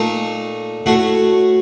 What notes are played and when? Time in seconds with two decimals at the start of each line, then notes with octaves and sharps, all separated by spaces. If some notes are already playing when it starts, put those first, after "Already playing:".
Already playing: A#2 A3 D#4
0.86 A2 A3 F#4